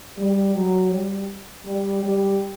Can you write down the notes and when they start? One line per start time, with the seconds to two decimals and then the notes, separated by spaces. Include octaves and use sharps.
0.17 G3
0.54 F#3
0.91 G3
1.65 G3
2.03 G3